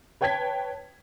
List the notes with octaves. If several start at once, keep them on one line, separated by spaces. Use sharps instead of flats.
B4 C#5 G5 A5 G#6 B6